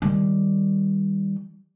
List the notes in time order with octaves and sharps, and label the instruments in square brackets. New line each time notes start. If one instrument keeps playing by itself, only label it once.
[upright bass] D#3 G3